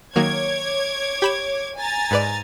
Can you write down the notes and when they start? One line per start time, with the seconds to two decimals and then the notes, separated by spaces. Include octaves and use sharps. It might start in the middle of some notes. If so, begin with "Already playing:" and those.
0.16 D#3 F#3 A#3 C#5 D6 G#6
1.22 G4 B5 E7
1.78 G#5 A#5 A6
2.11 G#2 B4 D5